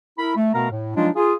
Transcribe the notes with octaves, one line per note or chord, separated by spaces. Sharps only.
E4 A#4 B5
A3
B2 A3 B3 A#4 F5 A#5
A2
F3 F#3 G#3 D4 D#4 F4
F4 G#4